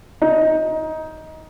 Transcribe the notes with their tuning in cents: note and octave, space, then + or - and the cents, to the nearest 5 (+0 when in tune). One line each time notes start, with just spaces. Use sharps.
D#4 +20